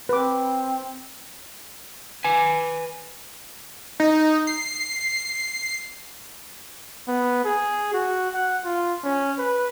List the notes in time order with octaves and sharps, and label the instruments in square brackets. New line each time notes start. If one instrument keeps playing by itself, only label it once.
[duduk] C4 [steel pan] B4 D6
[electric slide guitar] B4 G#5
[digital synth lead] D#4
C7
[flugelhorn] B3
G#4
F#4
F#5
F4
C#4
B4